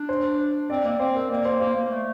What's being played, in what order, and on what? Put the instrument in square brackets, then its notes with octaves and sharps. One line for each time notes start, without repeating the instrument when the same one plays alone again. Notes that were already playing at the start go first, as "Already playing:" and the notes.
Already playing: [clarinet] D4
[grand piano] C5
[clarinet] C4 [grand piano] D5
[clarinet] A#3 [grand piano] D5
[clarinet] C4 [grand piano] C5
[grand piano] A#4
[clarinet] A#3 [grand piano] D5
[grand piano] C5
[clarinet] A#3 [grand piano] C5
[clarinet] A#3
A3